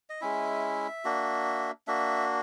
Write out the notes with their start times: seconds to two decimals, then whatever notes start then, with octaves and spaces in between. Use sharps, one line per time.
0.09 D#5
0.21 G#3 C#4 E4 E5
1.05 A#3 D4 F#4
1.87 A#3 D4 F#4 E5